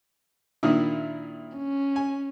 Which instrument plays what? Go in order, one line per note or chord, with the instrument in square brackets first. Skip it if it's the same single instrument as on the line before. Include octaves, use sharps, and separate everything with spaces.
[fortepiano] A#2 D#3 E4 [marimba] D4
[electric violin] C#4
[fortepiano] G#5